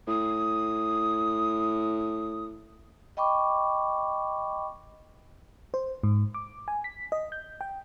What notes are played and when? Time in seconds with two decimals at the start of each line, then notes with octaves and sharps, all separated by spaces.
0.07 A2 D#6
3.17 D#5 G5 B5 C#6 D6
5.74 C5
6.03 G#2
6.34 D6
6.68 G#5
6.84 B6
7.12 D#5
7.32 G6
7.61 G5